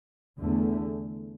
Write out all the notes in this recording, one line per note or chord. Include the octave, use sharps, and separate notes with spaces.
E2 D3 A3